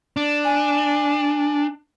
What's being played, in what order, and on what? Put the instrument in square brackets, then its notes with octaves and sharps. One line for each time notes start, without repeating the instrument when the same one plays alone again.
[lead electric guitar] D4
[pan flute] G#5